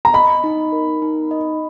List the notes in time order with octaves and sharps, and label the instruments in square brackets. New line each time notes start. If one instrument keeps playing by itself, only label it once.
[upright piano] A#5
[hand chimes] D#5 [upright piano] B5
[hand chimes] D#4
A#4
D#4
D#5